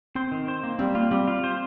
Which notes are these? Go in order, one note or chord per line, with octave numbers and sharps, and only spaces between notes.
C4 C5
D#3
C5
A#3
G3 C4
A#3 F4
G3 C4
F4
C5